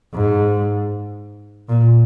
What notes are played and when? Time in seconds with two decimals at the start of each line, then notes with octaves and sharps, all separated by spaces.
0.14 G#2
1.69 A#2